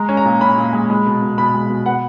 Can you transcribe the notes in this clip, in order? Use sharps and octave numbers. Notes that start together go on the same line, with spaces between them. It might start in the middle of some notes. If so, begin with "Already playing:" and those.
Already playing: G#3 A#5
C#4
A#5
A#2
C#4 B5
A#2
G#3
G#3
B2
B2
B2 B5
G#3
B2
B3 F#5